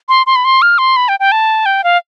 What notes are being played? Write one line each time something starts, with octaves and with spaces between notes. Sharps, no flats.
C6
C6
B5
C6
F6
C6
B5
G5
G5
A5
G5
F5